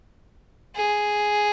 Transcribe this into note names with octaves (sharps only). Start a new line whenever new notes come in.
G#4